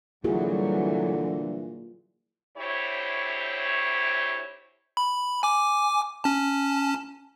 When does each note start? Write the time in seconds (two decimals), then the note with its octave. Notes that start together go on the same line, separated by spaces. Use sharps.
0.24 A#2 D3 E3 F#3 G3 E4 F#4 G#4
2.58 D2 E4 G4 C5 C#5
4.97 B5
5.43 G#5 D6
6.24 C#4 A5